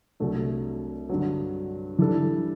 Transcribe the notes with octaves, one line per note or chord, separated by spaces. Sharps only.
C2 C3 F#3 A3 D4
G2 D3 F#3
E3 G3 D4 A4